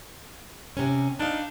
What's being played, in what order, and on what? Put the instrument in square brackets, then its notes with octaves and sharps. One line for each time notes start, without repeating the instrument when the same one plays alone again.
[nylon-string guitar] C3 C#4
[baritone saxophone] D4 [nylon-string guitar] D#4 F5